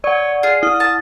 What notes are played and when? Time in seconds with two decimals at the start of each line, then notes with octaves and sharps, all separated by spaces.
0.04 C#5 D5 F#5
0.43 F4 G#4
0.63 E4 D#6 F6
0.80 A5